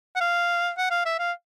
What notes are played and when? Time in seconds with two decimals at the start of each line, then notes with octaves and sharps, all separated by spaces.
0.16 F#5
0.20 F5
0.77 F#5
0.90 F5
1.05 E5
1.19 F5